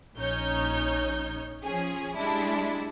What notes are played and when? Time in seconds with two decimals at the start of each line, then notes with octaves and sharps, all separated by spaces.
0.16 A#1 C#4 D#4 C#5 G6
1.62 F3 C#4 G#4
2.16 G3 G#3 D4 E4